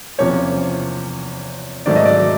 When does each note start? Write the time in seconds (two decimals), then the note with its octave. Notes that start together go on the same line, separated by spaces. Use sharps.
0.18 E2 C3 F3 A#3 C#4 C#5
1.86 G#2 D#3 F#3 A3 D5
1.96 D#5
2.05 D5